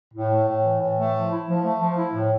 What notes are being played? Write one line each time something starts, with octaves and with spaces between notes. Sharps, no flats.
A2
A3
A2
E3
A2
A3
F3
E4
F3
A3
F3
E4
A2